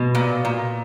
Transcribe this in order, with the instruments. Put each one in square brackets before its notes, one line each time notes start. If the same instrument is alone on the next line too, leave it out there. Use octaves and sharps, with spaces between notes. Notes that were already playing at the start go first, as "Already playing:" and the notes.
Already playing: [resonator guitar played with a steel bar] B2
A#2
A#2